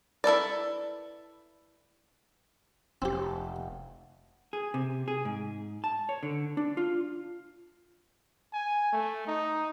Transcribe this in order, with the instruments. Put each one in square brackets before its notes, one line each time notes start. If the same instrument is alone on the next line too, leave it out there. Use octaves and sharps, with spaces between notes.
[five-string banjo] E4 A4 B4 D5
[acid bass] F1 [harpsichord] C4 G4
[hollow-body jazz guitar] G#4
C3
G#4
G#2
A5
C#5
D3
D4
F4
[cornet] G#5
A3
D#4